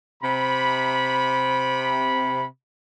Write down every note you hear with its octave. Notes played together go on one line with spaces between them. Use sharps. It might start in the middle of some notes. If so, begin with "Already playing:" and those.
C3 B5